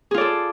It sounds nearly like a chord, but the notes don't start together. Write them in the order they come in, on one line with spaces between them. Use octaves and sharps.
G#4 F4 D5 A4